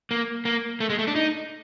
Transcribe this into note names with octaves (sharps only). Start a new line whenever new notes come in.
A#3
A#3
A3
G#3
A3
D4
D#4